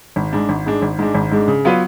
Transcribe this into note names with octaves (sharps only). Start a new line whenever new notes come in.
G#1
G#2 G#3 D4
G#1
G#2 G#3 D4
G#1
G#2 G#3 D4
G#1
G#2 G#3 D4
C#3
F#3 B3 F4 B4